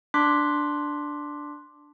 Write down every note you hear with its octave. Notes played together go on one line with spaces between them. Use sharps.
D4 C6 D6 F#6 B6